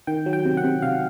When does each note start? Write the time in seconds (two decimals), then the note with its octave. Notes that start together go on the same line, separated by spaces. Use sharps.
0.07 D#3 G5
0.26 F#3
0.33 G5
0.45 C3
0.57 F#5
0.64 C3
0.82 C3 F5